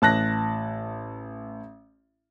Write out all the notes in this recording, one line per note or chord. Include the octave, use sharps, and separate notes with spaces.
A1 A5 F#6 A#6